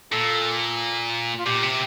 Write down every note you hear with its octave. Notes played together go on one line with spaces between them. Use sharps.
A#2 A4
F4
A#2 G4
C3